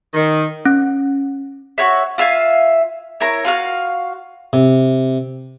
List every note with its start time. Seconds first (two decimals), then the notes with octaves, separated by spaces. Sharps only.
0.14 D#3
0.65 C#4
1.78 F#4 C#5 E5
2.18 F4 E5 F5 G#5
3.20 E4 A#4 C#5 A#5
3.45 F4 F#4 F5
4.53 C3